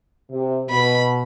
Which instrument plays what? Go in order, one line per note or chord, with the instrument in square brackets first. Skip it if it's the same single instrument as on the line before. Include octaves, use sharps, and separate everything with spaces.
[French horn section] C3
[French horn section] B2 [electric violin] B5